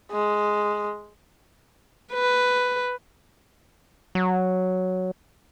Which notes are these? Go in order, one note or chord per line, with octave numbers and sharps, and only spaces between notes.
G#3
B4
F#3